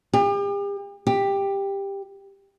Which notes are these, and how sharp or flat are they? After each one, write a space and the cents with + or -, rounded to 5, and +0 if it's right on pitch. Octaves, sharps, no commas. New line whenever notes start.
G4 +40
G4 +10